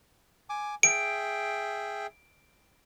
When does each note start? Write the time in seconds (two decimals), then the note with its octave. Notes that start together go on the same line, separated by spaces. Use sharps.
0.49 G#5 D6
0.83 G#4 E5 G5 D7